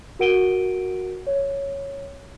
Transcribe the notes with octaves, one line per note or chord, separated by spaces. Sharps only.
F#4 A#4 F#5 D7 D#7 G7
C#5